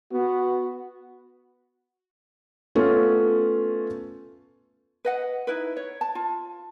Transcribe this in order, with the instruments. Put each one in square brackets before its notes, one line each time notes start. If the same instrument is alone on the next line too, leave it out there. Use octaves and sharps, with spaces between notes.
[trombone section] B3 [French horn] F#4
[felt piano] A3 B3 C#4 F4
[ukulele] B4 D#5 F#5
D#4 E4 B4
C#5
A5
F4